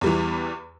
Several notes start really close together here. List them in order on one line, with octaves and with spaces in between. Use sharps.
E2 G3 E3